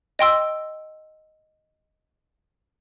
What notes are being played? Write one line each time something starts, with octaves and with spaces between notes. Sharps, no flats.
D#5 G5 C6 E6